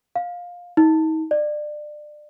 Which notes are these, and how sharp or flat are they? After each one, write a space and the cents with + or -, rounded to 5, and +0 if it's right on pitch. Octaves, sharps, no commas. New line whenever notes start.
F5 +15
D#4 +35
D5 +25